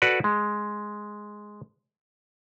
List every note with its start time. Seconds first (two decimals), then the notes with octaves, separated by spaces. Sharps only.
0.02 F#4 A4 B4 D5
0.24 G#3